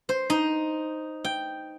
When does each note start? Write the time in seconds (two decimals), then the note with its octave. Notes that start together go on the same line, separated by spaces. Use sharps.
0.09 C5
0.30 D#4
1.24 G5